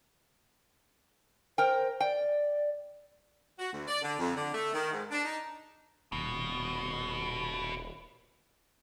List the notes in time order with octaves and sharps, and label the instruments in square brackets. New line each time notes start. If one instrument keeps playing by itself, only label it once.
[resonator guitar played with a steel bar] A#4 G5 [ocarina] C5
[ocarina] D5 [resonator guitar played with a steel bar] G5
[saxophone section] F#4
D2
D5
D3
F2
D3
A3
D#3
G#2
D4
D#4
[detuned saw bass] D#1 [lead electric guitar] B2